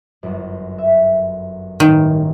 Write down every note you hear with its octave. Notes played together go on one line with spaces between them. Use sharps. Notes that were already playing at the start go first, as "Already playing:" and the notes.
G1 F#2
E5
A1 G2 D#3